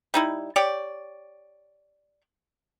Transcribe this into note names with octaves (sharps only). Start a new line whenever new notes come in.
G3 D#4 E4
G4 C#5 D5